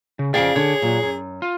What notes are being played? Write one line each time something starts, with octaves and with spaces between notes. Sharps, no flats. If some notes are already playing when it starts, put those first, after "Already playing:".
C#3
F2 C#3 G#4 D5 F5 G5
D3 C#5
A#2 F#3
F#2
F4